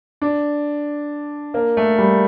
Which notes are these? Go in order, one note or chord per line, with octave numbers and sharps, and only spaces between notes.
D4
A#3
A3
G3